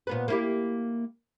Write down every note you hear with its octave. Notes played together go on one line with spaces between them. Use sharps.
A#2 B3 B4
A#3 E4 G4